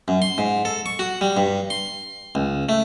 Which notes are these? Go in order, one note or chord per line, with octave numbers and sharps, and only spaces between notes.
F#2
C6
G#2
A4
C#6
F#4
G3
G2
C6
C#2
A3